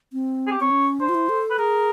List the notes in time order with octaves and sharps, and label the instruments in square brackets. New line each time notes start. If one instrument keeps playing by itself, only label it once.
[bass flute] C4
[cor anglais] G#4
G4
[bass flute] C4 [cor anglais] C#5
[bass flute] C#4
[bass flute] D4 [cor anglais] C5
[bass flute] F4
E4
A4
[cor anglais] B4
[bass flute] G#4 [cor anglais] A#4